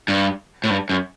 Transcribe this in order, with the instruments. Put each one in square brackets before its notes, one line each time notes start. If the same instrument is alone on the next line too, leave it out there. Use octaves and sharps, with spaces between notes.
[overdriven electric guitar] G2
A2
G2
F#2